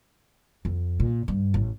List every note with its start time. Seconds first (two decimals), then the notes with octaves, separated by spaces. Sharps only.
0.65 F2
1.00 A#2
1.28 G2
1.54 A1